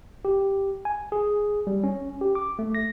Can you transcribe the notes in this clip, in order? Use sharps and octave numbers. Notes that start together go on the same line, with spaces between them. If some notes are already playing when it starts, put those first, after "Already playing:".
G4
G#5
G#4
G3
C#4
G4
D6
A3
A#6